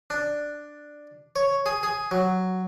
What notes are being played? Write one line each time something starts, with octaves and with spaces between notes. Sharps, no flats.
D4
C#5
G#4
G#4
F#3